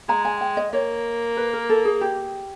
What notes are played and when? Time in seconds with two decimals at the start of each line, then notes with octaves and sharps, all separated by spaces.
0.08 G#3 A#5
0.25 G#5
0.41 G5
0.57 D#5
0.73 A#3 C#5
1.37 B4
1.53 A#4
1.69 A4
1.85 G#4
2.01 G4